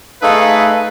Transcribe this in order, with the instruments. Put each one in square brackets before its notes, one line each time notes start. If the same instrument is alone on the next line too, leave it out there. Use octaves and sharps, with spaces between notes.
[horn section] A3 G#4 B4 [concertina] D#4 A4 [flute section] F5